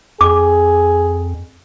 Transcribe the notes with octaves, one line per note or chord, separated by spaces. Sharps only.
F2 G#4 D6